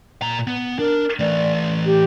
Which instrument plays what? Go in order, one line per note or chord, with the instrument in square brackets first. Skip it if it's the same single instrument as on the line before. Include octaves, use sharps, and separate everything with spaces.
[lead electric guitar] A#2 A#5
B3
[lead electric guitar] D4 [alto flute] A#4
[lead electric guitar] E3 A3 [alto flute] D5
[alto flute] G4